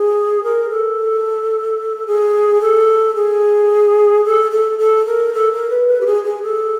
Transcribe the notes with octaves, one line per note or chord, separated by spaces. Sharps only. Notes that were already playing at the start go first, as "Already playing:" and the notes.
Already playing: G#4
A#4
A4
G#4
A4
G#4
A4
A4
A4
A#4
A4
A#4
B4
B4
G4
G#4
G#4
A4